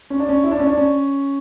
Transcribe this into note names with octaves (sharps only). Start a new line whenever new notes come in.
C#4
D4
C#4
E4
D4
C#4
D4
C#4